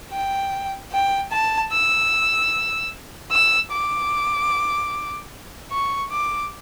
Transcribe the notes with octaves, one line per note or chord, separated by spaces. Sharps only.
G5
G5
A5
E6
E6
D6
C#6
D6